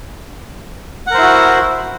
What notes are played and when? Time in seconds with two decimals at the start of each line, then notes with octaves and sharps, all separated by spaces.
1.07 F#5
1.11 A#4
1.14 C5
1.18 E4
1.22 F#4